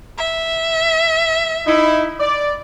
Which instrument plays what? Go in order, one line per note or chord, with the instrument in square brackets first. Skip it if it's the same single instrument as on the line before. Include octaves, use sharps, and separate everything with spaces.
[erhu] E5
[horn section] D#4 E4
D5